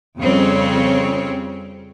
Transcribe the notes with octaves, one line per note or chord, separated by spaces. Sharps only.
F2 C#3 G3 C4 C#5